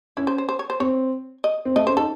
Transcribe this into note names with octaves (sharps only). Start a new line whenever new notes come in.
C#4 E4
C5
C5
C5
C#5
C5
C4 C#5
D#5
C4
A3 D#5
C#4 C5
D#4 A4